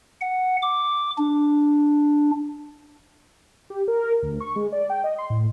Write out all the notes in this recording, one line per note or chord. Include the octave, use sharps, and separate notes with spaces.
F#5
D6
D4
G4
A#4
D2
C#6
G#3
D5
G5
D#5
C6
A2